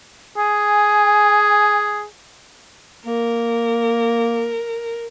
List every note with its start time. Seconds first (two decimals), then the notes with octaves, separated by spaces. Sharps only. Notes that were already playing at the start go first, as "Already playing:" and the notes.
0.37 G#4 G#5
3.05 A#3 A#4